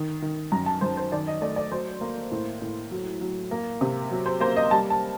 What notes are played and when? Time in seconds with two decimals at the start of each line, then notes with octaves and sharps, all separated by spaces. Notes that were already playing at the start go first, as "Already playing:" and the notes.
Already playing: D#3
0.22 D#3
0.52 F#2 A#5
0.66 A5
0.81 F#2 C5
0.97 C5
1.12 D#3 D5
1.27 D#5
1.41 A3 D5
1.56 D5
1.72 F#3 C5
2.01 A#3
2.32 A2
2.62 A2
2.91 F#3
3.21 F#3
3.51 A#3
3.81 C3
4.11 F#3
4.26 C5
4.40 A#3 C5
4.56 D#5
4.71 G3 A5
4.90 A5